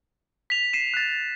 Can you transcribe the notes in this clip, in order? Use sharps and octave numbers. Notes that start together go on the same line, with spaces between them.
B6 F7
C7 D#7 E7
F#6 A6